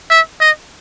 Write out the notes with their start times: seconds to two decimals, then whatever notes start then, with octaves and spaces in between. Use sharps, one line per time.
0.10 E5
0.41 D#5